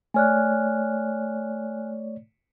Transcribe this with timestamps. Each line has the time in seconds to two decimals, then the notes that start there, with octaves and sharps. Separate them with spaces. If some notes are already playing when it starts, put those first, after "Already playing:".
0.14 A3 C#5 D5 G#5 F6 F#6